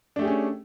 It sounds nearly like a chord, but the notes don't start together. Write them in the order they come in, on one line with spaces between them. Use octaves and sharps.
D4 A3 G4 G#4 C#4